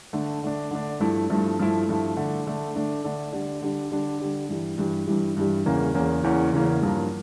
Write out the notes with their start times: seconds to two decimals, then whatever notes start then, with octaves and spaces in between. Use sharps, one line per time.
0.13 D3 A3 D4
0.43 D3 A3 D4
0.71 D3 A3 D4
1.00 G2 F3 A3 E4
1.30 G2 F3 A3 E4
1.59 G2 F3 A3 E4
1.88 G2 F3 A3 E4
2.17 D3 A3 D4
2.46 D3 A3 D4
2.75 D3 A3 D4
3.04 D3 A3 D4
3.33 D3 G3 D4
3.62 D3 G3 D4
3.92 D3 G3 D4
4.20 D3 G3 D4
4.49 G2 E3 G3
4.78 G2 E3 G3
5.07 G2 E3 G3
5.36 G2 E3 G3
5.65 E2 C#3 E3 A#3 C#4
5.94 E2 C#3 E3 A#3 C#4
6.23 E2 C#3 E3 A#3 C#4
6.53 E2 C#3 E3 A#3 C#4
6.82 G2 F3 A#3